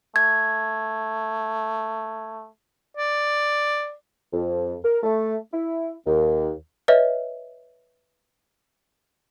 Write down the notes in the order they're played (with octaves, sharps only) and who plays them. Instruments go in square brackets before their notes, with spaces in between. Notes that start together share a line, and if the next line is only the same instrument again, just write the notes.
[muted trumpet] A3 [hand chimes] G#6
[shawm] D5
[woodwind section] F2
A#4
A3
E4
D#2
[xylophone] B4 C#5 D#5 E5